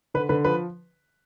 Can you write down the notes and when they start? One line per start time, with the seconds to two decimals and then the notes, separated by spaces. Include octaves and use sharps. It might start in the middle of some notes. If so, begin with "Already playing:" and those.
0.14 D3 B4
0.29 D3 B4
0.45 F3 B4